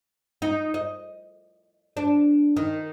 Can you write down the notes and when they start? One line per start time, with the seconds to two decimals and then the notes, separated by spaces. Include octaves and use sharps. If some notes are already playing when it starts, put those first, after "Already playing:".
0.42 D#4
0.74 D#5
1.97 D4
2.57 D#3